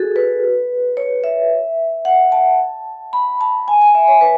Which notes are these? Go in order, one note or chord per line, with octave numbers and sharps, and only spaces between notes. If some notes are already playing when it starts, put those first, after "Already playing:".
Already playing: F#4 G#4 A4
B4
C#5
E5
F#5
A5
B5
A5
G#5
G#5
E5
C#5
B4